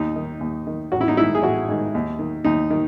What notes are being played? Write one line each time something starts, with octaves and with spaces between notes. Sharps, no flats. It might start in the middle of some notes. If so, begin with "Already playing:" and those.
Already playing: D#2 D#4
D#3
D#2
D#3
A1 F#4
E4
D#4
G#2 D#3 E4
G#4
A1 F#4
G#2 D#3
D#2
D#3
D#2 D#4
D#3